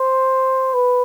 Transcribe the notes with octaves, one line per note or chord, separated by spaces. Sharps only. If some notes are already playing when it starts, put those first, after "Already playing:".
Already playing: C5
B4